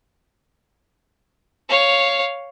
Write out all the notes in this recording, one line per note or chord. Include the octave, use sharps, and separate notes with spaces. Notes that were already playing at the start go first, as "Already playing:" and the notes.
C#5 F5